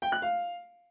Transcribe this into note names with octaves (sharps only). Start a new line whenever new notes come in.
G5
F#6
F5